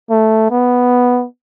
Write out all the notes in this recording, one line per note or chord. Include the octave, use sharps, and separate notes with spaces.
A3
B3